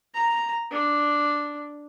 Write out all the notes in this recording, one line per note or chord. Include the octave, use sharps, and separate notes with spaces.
A#5
D4